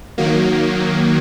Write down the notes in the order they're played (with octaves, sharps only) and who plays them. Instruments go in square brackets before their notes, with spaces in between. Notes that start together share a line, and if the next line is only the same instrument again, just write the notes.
[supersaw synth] D#3 F#3 A#3